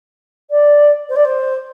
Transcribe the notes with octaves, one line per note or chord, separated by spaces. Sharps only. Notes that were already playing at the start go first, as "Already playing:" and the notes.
D5
C5
D5
C5